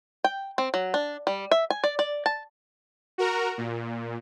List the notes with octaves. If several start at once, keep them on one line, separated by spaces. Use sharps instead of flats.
G5
C4
F#3
D4
G3
E5
G#5
D5
D5
A5
F#4 A#4 A#5
A#2